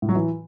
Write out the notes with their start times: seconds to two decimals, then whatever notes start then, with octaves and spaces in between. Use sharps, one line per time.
0.02 A2
0.09 F#3
0.15 E3